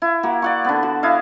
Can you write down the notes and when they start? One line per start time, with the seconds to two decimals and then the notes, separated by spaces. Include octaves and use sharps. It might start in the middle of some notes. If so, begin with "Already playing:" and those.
0.02 E4
0.23 A#3 F#4
0.42 D5 F#5 C#6
0.65 D3 B3
0.83 F#4
1.03 E4 D#5 F5